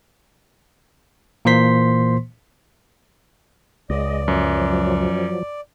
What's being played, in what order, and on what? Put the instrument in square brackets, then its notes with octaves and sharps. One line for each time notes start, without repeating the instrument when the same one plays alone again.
[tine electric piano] A#2 E3 A#3 C5 C6 B6
[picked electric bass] C#2 [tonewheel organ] G#3 D#5 [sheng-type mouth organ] D5
[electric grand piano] F#2 [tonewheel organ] F3 F#3